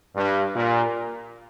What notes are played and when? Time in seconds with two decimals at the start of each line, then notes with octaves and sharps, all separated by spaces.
0.15 G2
0.54 A#2